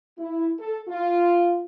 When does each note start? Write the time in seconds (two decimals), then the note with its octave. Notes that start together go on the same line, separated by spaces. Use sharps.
0.19 E4
0.59 A4
0.88 F4